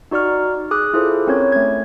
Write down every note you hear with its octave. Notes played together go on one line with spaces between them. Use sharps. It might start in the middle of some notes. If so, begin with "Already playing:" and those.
D#4 F#4 D5 C#6 F6
G#4 D6 D#6 F#6
E4 F4 G#4 A4 C5
C4 C#4 A#4 C#5 G#6
A3 G#6